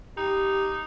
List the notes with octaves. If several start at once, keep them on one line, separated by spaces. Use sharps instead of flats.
D#4 G4